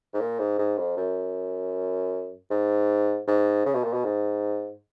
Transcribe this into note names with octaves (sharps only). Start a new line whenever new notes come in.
G#2
A#2
G#2
G#2
F2
F#2
G#2
G#2
C#3
B2
A#2
B2
G#2